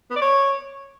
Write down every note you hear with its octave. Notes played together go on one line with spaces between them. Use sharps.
B3
D5
C#5